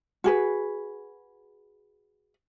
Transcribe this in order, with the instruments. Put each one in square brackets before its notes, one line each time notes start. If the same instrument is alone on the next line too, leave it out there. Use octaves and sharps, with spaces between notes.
[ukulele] F#4 G#4 B4